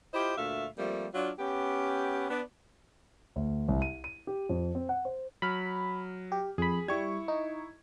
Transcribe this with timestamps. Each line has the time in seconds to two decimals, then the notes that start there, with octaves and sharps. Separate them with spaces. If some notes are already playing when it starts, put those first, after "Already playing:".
0.14 E4 F4 G4 C5 D#5
0.38 D2 A#2 A3 E5 F5
0.78 F3 G3 A3 A#3 C4
1.14 F#3 D4 F4
1.39 B3 C#4 G4
2.30 B3 D4
3.36 D2
3.68 C2
3.82 D#7
4.04 D#7
4.27 G4
4.49 F2
4.75 C4
4.89 F#5
5.05 C5
5.42 F#3 B5 F6
6.32 G4
6.58 F2 G#4 B5
6.88 G3 E4 C#6 G#6
7.28 D#4